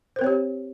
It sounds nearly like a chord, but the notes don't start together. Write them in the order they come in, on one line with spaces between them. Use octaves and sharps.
C5 A#4 C4 C#5 G4